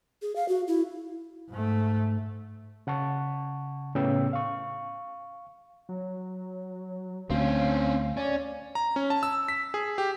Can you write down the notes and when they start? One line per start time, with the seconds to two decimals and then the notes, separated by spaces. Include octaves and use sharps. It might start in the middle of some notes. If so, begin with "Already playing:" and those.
0.22 G#4
0.36 F5
0.49 F#4
0.68 E4
1.49 G#2 A3
2.87 C#3 F#5 A5 C#6
3.95 A2 C#3 B3 C#4 G5 E6
4.33 F5 C#6
5.89 F#3
7.30 D2 C4 C#4 F5
8.17 C#4 D5
8.75 A#5
8.96 C#4
9.10 A5
9.23 E6
9.48 B6
9.74 G#4
9.98 G4